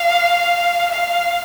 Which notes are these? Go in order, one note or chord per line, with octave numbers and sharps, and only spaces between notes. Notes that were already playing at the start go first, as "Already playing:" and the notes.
Already playing: F5
F5